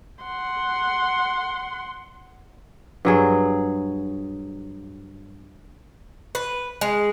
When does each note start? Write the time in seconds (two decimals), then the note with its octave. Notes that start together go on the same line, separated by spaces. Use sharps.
0.23 F#5 C6
3.05 G2 F#3 G#4
6.35 B4
6.81 G#3